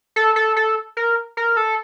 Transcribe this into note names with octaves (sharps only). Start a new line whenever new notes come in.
A4
A4
A4
A#4
A#4
A4